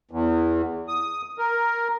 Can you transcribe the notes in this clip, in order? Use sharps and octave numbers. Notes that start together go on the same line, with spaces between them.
E2
D#6
A#4